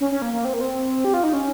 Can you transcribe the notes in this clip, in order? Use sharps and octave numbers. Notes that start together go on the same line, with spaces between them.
C#4
C#4
A#3
A#3
C4
A#3
C4
G4
F4
D#4
C#4